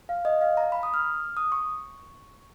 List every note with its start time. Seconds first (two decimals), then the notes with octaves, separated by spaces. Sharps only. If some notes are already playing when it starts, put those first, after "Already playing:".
0.09 F5
0.25 D#5
0.41 F5
0.57 A#5
0.72 B5
0.83 D#6
0.94 F6
1.37 D#6
1.52 C#6